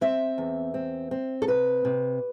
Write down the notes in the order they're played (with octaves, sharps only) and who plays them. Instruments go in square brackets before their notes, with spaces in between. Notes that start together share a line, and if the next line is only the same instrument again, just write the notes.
[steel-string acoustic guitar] C4 E5
E2
C4
C4
A4
C3 B4
C3